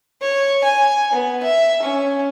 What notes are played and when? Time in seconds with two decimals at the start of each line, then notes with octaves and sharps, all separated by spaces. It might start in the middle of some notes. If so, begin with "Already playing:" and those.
0.21 C#5
0.64 G#5
1.13 B3
1.43 E5
1.82 C#4